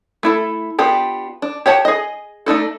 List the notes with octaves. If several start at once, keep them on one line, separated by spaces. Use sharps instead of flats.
A3 E4 A4
B3 D4 F4 G4
D4
G4 C#5 F#5 A5
G#4 D#5
A3 D4 D#4 A4